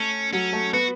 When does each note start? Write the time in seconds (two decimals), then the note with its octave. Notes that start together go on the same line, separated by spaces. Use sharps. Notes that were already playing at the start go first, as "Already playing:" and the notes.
Already playing: A3 C#4 A4
0.33 F#3 C#4 F#4
0.53 A3 A4
0.73 B3 F#4 B4